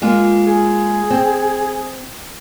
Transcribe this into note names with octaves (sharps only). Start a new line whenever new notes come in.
G#3 A#3 F4
G#4
C4